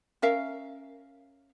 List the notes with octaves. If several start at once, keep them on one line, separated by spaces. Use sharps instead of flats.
C#4 A#4 E5 F5